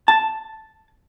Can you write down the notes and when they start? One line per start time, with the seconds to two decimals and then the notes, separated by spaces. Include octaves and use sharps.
0.08 A5